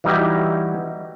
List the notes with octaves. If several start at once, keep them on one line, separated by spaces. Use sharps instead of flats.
E3 G3 D#4 E4 F#4 G4